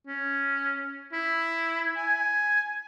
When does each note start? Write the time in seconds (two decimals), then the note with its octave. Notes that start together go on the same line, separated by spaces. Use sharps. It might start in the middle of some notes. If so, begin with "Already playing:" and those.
0.07 C#4
1.13 E4
1.97 G#5